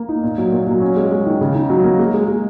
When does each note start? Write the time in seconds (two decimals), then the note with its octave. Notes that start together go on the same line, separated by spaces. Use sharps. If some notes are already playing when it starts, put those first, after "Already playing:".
Already playing: A#3
0.09 D#4
0.24 A#2
0.38 F#3
0.52 A#2
0.67 F#3
0.81 C#4
0.97 G#3
1.11 G#3
1.26 D#3
1.41 C#3
1.55 D#4
1.70 F#3
1.84 A#3
1.99 G#3
2.14 G#3
2.28 G#3